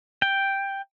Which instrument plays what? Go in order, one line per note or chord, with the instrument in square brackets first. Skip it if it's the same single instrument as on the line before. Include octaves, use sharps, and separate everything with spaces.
[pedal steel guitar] G5